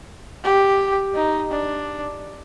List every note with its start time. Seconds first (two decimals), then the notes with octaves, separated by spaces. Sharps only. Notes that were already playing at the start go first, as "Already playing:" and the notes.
0.44 G4
1.15 D#4
1.51 D4